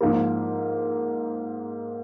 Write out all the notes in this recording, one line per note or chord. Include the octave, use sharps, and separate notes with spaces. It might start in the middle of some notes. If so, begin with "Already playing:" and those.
G#2 F3 A#3